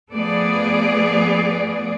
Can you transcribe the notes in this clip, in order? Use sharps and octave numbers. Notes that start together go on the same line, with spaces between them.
F3 A3 B3 G#4 D5